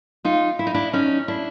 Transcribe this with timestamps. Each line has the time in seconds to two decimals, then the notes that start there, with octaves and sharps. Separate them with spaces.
0.25 D#4 F4
0.59 E4
0.67 D#4
0.74 D4 E4
0.93 C#4 D#4
1.28 D4 E4